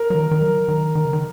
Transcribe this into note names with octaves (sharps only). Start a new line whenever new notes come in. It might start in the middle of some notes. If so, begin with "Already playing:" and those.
Already playing: A#4
F#3
D#3
D#3
F#3
D#3
D#3
C#3
D#3